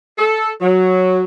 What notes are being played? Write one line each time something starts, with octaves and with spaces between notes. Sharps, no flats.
A4
F#3